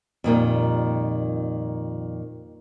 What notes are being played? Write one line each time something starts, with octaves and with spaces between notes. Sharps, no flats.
F2 A#2 D#3 G3